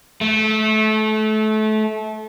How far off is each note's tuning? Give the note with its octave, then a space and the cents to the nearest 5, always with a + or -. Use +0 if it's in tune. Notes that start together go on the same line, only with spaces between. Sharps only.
A3 -25